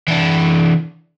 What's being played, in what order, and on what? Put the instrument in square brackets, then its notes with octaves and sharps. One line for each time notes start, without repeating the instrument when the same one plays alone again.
[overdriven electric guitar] E3 D4